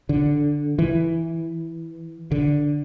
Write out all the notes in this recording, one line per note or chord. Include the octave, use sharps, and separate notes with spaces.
D3
E3
D3